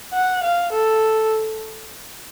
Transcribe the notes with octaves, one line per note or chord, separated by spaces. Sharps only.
F#5
F5
A4